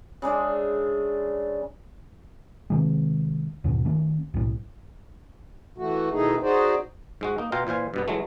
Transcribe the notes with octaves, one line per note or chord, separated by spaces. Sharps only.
C#3 G#3 D4 E5
C3 D#3 G#3
D#2 G#2 B2
D#3 A3 C#4
B1 A2
E3 A3 F#4
B2 D#3 E3 A3 D#4 G#4
D#4 F#4 G#4 C5 D5
G#2 G#3 F#4
A#3 D#4
B2 F4 F5 G5 A#5
A#2 E3 C5 F5 G#5
G2 B2 B3
E3 F#3 G#3 A3